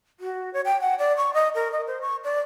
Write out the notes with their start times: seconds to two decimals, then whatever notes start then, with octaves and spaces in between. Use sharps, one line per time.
0.20 F#4
0.53 C#5
0.65 G5
0.81 F#5
0.99 D5
1.17 C#6
1.34 D#5
1.55 A#4
1.72 D#5
1.87 C5
2.01 C#6
2.24 D5